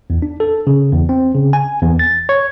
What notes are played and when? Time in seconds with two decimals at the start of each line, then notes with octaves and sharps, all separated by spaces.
0.10 E2
0.22 D4
0.40 A4
0.67 C#3
0.92 E2
1.09 C4
1.35 C#3
1.53 G#5
1.82 E2
1.99 A6
2.29 C#5